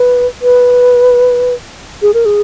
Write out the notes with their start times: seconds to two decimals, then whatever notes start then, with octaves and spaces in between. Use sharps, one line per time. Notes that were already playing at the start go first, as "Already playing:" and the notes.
Already playing: B4
0.42 B4
2.02 G#4
2.14 A#4
2.26 G#4